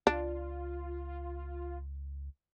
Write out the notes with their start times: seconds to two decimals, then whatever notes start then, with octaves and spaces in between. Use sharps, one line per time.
0.07 C#2 D4 F4